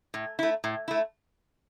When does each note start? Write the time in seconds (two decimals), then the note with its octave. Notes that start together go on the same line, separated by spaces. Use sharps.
0.14 A2
0.39 A3 E4
0.64 A2
0.88 A3 E4